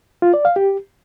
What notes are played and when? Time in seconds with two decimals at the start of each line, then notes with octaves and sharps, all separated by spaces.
0.22 F4
0.34 D5
0.45 F5
0.56 G4